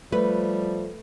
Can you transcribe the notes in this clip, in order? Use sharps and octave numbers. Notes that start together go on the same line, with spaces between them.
F3 G3 A3 B4